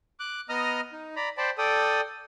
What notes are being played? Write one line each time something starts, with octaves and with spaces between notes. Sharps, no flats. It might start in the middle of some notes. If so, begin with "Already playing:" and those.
D6 F#6
B3 D#5 A#5 D#6 F6
D#4
D5 A#5 B5
C5 D5 G5 A5 B5
A4 D5 G5 D#6